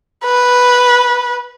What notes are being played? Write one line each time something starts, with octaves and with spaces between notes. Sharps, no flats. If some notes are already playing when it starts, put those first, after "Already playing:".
B4